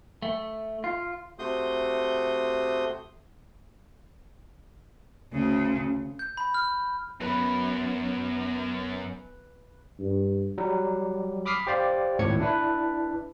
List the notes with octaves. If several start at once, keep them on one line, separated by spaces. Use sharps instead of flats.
A3
F4
C3 A3 F#4 C6 D#6 G6
D2 C#3
G6
B5
F6
F#2 B3 B4
G2
F#3 G3
B5 D6 D#6 F6 B6 C7
G4 C5 D5 F5
G#1 C#2 A2 C#5 G#6 C#7
D4 E4 B4